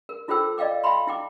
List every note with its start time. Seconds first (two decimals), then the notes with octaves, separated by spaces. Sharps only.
0.09 A#4
0.28 E4 F4 A4 C5 G5 E6
0.58 D5 D#5 F5 G5 D6
0.84 E5 F5 G5 G#5 B5 C6
1.07 E4 G5 D6